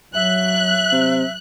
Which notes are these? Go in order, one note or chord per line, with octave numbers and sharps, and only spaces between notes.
F#3 E5 F#6
C3